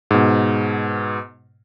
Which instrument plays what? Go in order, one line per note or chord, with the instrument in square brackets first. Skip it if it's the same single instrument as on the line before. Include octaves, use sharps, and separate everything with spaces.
[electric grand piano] G#2 B2